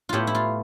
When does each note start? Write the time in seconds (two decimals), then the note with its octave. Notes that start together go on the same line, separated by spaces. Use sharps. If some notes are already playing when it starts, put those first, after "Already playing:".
0.09 A2 G3 B3 E4 F4 G4
0.27 E4
0.35 F4